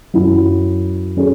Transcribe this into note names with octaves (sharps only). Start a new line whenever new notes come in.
F#2 F#3 E4
F#3 C#4 G#4